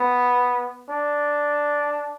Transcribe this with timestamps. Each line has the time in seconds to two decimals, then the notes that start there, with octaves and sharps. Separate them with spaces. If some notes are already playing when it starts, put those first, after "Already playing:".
Already playing: B3
0.89 D4